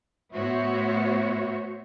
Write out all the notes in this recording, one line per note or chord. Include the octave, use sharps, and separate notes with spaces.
A2 B3 F#4 C5 C#5 E5